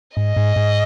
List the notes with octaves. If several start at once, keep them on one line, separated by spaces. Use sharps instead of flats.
G#2 D#5
G#2
G#2